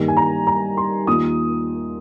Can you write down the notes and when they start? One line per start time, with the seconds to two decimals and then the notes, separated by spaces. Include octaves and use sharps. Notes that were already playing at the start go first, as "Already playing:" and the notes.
Already playing: G2 D#3 G3 A#3
0.08 G#5
0.17 A#5
0.47 A#5
0.77 C6
1.07 D#2 D#3 A#3 F4 D#6